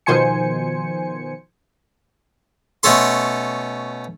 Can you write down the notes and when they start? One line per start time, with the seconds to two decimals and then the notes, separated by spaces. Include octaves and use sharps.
0.06 B2 D#3 F3 C5 G#5 C#7
2.83 B2 A3 C#4 A4 C6